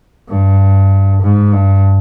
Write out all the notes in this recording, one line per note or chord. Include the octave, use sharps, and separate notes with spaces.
G2
G#2
G2